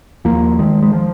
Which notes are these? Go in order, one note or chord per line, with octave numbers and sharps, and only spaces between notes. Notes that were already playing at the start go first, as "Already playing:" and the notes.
D#2 F3 A#3
D#3 G#3
G#3
F3